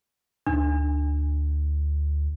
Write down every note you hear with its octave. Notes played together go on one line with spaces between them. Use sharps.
D2 D4